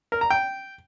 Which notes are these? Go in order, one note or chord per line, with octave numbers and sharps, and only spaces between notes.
A#4
A#5
G5